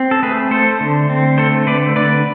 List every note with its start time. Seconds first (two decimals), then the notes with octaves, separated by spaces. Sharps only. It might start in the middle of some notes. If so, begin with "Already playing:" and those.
Already playing: C4
0.11 A4
0.22 A3 G#4 B4
0.51 A3 A4 C5
0.80 D3
1.10 C4
1.38 A3 A4 C5
1.67 D3 B4 D5
1.96 D3 B4 D5